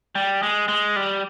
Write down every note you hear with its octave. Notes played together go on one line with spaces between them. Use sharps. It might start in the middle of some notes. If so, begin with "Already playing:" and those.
G3
G#3
G#3
G3